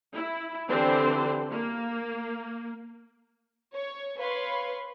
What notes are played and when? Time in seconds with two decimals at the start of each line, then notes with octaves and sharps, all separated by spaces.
0.14 E4
0.67 D3 E3 C4 D4 G4 C5
1.51 A#3
3.73 C#5
4.18 B4 C#5 F5 B5 C6